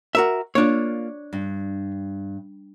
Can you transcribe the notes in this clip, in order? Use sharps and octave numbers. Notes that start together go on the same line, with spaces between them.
F#4 A#4 E5
A#3 D4 F4 C#5
G2